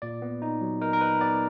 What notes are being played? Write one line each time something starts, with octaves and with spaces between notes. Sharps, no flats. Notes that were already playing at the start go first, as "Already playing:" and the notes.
A#2 D5
B3
D#4
F#3
D#4 A#4
A#4
D#4 B4
B3 D5